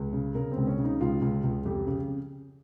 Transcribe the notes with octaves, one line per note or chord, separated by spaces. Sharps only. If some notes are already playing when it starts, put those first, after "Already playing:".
Already playing: C#2
C#3
C#3 A#4
C4
C#2
C#4
C#3
D#4
C#2 F4
C#2
C#2
F2 G4
C#3